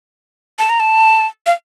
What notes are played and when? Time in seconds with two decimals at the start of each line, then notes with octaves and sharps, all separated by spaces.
0.59 A5
0.70 A#5
0.80 A5
1.46 F5